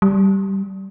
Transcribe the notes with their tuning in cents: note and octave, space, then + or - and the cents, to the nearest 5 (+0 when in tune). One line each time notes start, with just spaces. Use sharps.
G3 -10